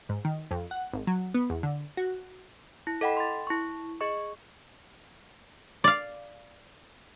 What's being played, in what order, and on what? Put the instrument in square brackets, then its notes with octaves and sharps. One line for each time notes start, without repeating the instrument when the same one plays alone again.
[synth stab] G#2
D#3
F2
F#5
G#1
F#3
B3
E2
D3
F#4
[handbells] E4
A4 D#5 F#5 G5 B5
C6 A6
E4 C#6
G#4 D#5 C#6
[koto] D5 F5